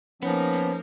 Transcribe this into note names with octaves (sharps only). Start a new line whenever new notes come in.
F3 A#3 B3 C#4 D#4